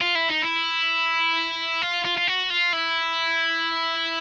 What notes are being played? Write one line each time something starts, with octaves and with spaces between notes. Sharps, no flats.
F4
E4
D#4
E4
F4
F4
F4
F#4
F4
E4